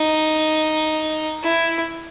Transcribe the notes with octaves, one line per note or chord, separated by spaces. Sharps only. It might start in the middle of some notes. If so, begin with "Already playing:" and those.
Already playing: D#4
E4